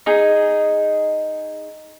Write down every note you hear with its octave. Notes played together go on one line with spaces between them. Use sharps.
D#4 G#4